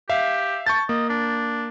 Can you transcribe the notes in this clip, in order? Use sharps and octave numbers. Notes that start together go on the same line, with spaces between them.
G4 E5 F5
A5 C#6 G6 A6
A#3 D#5
D4